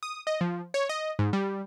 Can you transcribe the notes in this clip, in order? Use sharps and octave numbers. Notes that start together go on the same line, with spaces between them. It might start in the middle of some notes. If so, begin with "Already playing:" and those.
D#6
D#5
F3
C#5
D#5
G#2
G3